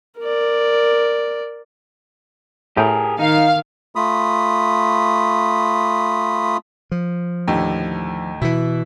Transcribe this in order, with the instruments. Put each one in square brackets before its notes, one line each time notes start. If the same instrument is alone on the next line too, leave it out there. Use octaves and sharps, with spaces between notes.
[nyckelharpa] A#4 D5
[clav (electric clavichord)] A2 G5 [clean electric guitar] G4 G#4 A#4
[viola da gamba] D#3 [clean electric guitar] D#4 [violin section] F5
[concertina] A3 F4 B5 D#6
[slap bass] F3
[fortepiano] D#2 A2 D3
[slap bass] B2 E3 [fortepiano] E4